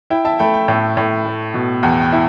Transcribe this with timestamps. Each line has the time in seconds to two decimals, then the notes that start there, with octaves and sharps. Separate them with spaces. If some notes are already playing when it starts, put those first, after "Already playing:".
0.10 E4 G5
0.25 E5 A5
0.39 A3 G5 B5
0.54 G5
0.68 A2
0.97 A2
1.25 A3
1.54 B2
1.83 E2 G5
2.02 G5
2.12 E4